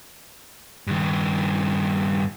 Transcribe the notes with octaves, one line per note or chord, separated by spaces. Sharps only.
G2 D#3